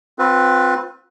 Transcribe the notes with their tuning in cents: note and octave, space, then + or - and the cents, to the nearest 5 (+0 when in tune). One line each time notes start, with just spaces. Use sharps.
C4 +0 F4 +40 B4 +0